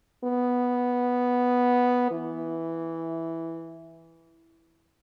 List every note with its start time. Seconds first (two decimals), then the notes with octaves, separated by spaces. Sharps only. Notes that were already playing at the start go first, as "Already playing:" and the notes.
0.24 B3
2.11 E3